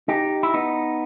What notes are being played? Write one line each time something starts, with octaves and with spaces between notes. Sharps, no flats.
D#4 G4
E4
B3 D#4